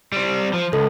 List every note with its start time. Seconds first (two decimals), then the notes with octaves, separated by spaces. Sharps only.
0.12 G3 C4
0.53 F3
0.73 C#2 A4